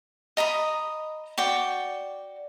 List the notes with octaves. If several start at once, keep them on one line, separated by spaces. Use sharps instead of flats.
D#5 A#5 B5 D#6
F#4 D5 G5